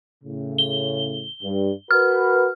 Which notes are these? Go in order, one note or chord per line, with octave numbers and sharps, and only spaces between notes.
A2 C#3
G7
G2
F#4 A#4 B4 F6